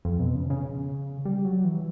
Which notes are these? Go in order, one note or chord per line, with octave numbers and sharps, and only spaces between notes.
F2
B2
C#3
C#3
G3
F#3
E3